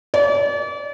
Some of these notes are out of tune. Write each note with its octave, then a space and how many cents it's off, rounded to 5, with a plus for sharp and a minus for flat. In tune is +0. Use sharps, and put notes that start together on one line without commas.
D5 -40